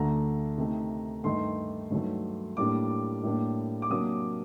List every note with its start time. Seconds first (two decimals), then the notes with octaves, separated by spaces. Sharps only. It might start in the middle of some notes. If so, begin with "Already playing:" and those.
Already playing: D2 D3 A3 D4 A#5
0.58 C3 D#3 A3
1.24 G2 D#3 A3 D#4 C6
1.91 G2 D#3 F#3 A3
2.57 A2 G3 A#3 D4 D6
3.23 A2 G3 A#3 D4
3.82 D6
3.90 C3 F#3 A#3 D4 D#6